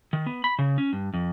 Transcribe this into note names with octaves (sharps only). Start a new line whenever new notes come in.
D#3
B3
B5
C#3
C#4
G2
F2